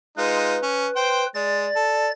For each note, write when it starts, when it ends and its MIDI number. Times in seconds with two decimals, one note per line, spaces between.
0.18 0.57 56
0.18 0.57 63
0.18 0.57 65
0.18 1.26 71
0.63 0.87 61
0.96 1.25 72
0.96 1.25 79
1.35 1.67 56
1.35 2.11 74
1.35 2.11 93
1.76 2.07 69